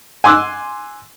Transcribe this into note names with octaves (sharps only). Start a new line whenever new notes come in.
G#5 C6 D6 E6 F#6